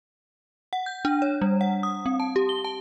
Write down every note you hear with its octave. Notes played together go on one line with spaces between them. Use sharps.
F#5
G6
D4
C#5
G3
F#5
D#6
C4
A5
G4
G7
A5